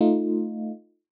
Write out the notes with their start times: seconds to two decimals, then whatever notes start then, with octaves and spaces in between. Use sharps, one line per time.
0.01 A3 D#4 F4